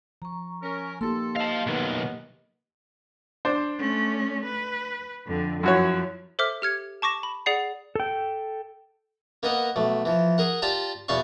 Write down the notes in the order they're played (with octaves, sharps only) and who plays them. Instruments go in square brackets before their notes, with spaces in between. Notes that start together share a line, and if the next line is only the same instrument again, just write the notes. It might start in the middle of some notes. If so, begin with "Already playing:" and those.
[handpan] F3 [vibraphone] A#5 C#6
[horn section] C#4 A#4
[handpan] A#3 D#4 G4 [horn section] A4 [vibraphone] C6
[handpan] D#5 [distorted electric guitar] F5 A5
[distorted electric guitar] B1 D#3 [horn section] B3
[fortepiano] D4 C5
[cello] A3 C#4
B4
F2 D3
[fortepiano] F#2 F#4 C#5 [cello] F3 E4
[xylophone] A4 C5 E5 D6 F6
G4 F6 G#6 C#7
A5 C#6 D6 A#6 E7
B5
G#4 D5 F#5 C7
[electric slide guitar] A4 G5
[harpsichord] A#3 B3 A#4 D#5 F#5
B1 A3
E3 F3
G#4 A#4 F#5
F4 G4 D5 A5 A#5
E2 B2 B3 D5 F5 C#6